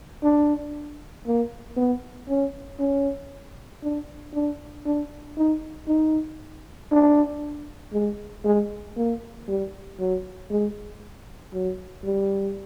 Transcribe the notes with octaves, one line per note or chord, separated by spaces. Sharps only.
D4
A#3
B3
C#4
C#4
D4
D4
D4
D#4
D#4
D4
G#3
G#3
A#3
G3
F#3
G#3
F#3
G3